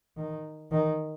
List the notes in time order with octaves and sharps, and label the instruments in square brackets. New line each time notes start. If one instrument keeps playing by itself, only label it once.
[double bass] D#3
D#3